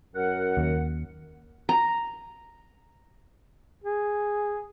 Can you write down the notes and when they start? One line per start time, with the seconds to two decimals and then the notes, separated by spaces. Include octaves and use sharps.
0.15 F#2 A#4 F#5
0.57 D#2
1.69 A#5
3.84 G#4